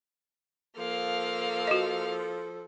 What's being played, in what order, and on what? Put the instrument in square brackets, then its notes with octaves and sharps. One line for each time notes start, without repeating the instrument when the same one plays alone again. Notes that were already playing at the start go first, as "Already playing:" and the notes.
[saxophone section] F3 A4 [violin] A#3 F5
[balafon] F#4 D#5